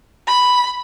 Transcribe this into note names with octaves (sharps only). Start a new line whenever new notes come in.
B5